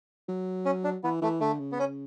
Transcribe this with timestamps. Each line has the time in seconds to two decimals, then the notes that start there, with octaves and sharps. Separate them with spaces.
0.29 F#3
0.65 C#4
0.84 D4
1.04 E3 B3
1.22 E3 A3
1.40 D3 A3
1.59 C#3
1.72 B3
1.79 C#4